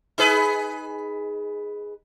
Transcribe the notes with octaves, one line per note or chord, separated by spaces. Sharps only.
D#4 G#4 B4